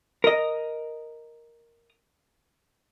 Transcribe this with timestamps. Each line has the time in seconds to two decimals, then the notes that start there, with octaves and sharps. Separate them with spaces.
0.24 A#4 D#5